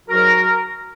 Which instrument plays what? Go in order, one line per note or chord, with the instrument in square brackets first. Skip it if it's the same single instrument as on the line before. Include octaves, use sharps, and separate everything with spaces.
[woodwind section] G#2 F#3 F#4 A#4